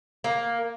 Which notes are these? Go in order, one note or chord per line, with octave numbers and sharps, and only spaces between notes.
A#3